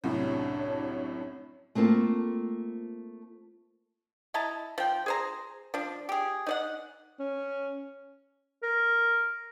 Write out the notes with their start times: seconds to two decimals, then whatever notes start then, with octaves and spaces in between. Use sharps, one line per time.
0.04 C2 F#2 A2 D4 C#5
1.75 A3 A#3 C4 F4 A4
4.34 E4 D#5 A5 A#5
4.78 F3 G5
5.06 G#4 C5 A#5
5.74 F3 D4
6.09 G4 G#4
6.46 D#4 D5 F#5
7.19 C#4
8.63 A#4